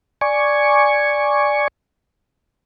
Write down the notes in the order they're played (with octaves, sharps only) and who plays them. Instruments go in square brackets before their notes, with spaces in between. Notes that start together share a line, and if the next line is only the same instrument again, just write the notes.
[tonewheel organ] D5 G#5 C#6